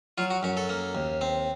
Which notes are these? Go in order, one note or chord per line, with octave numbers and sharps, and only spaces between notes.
F#3 F4
F#4
F#2 F#4
A4
A#3
D#2
C4